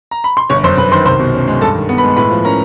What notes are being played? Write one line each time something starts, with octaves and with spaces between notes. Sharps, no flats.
A#5
B5
C6
G1 C#5 C#6
F#2 C5 C6
G1 B4 B5
D#3 C5 C6
C2 C5 C6
B2
C#4
G#3
G2 A4 A5
D#3
B3
B4 B5
G#3
A2 B4 B5
F3
C#4 A#4 A#5